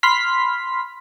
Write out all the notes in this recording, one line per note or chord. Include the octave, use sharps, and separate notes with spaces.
B5 C6 F6 B6